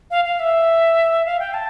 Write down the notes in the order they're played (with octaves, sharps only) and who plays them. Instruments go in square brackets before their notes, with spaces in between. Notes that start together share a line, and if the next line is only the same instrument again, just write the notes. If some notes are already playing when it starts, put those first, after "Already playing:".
[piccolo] F5
F5
E5
F5
G5
A5